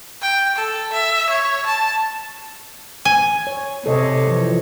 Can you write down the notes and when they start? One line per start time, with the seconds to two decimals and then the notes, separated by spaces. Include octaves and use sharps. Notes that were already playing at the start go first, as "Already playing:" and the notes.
0.22 G5
0.56 A4
0.93 E5
1.30 C#5
1.66 A5
3.05 G#5
3.47 C#5
3.86 C3 A4 C#5 D#5
4.27 E3 F3